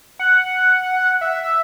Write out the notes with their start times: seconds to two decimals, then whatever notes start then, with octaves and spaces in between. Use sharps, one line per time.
0.19 F#5
1.21 E5